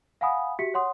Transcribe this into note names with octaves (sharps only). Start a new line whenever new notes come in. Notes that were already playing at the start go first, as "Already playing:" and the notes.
F5 F#5 G#5 B5 D#6
F#4 G4 E5 B6 C#7
C#5 F#5 C6 D#6